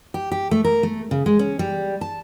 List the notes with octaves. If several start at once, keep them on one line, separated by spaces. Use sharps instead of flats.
G4
G4
A3
A#4
A3
C#3
G#3
C#4
G3
A5